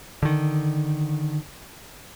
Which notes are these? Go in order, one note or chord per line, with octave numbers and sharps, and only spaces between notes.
D3 D#3